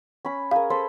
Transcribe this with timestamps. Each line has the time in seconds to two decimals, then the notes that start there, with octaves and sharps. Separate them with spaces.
0.25 C#4 B5
0.51 G#4 A#4 F5
0.70 A4 C5 B5